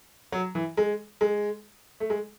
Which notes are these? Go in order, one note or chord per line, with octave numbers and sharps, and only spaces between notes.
F#3
E3
G#3
G#3
A3
G#3